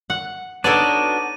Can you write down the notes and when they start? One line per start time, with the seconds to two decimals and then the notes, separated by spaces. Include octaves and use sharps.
0.10 F#5
0.64 B3 D4 D#4 F#4 A4 C#5 D5 D#7